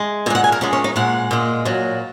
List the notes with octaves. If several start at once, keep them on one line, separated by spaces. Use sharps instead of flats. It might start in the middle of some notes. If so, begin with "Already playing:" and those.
Already playing: G#3
A#2 G#3 F#5 G#5
G#5
A#4
A#2 G#3 C#4
C#4
D#4
A#2 G#3 F#5
A#2 G#3
A#2 F#3